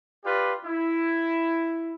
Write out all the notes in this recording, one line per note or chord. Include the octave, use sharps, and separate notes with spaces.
F4 G4 B4 D5
E4